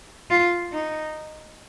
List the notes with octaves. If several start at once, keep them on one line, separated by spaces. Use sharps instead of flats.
F4
D#4